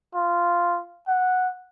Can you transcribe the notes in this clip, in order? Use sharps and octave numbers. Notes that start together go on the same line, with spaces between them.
F4
F#5